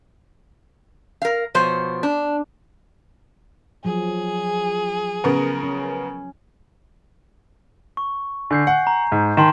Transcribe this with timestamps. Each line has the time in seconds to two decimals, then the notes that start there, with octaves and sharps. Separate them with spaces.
1.22 A#4 F5
1.55 B2 F3 C5 C#5
2.03 D4
3.85 F3 F#3 G#4
5.24 C#3 B3 A#4
5.63 C#4
7.97 C#6
8.51 D3 G#5 G6 C7
8.67 F#5
8.87 A#5
9.12 G#2
9.37 D#3 A5 C6 E7